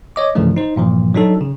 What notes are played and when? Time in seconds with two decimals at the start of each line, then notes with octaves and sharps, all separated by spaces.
0.16 C#5 D#5 D6
0.35 C2 G2 C#3 E3 F3 A3
0.56 D#4 C5
0.76 G2 A#2 E3 F3
1.14 F#3 D4 D#4 A4
1.41 C#3